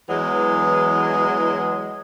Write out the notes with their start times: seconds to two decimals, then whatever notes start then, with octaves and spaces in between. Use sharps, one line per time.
0.09 E2 E3 F#3 G#3